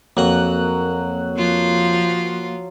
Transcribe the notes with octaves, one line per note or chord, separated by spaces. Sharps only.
F2 F#3 A#3 A#5 F#6
F3 F4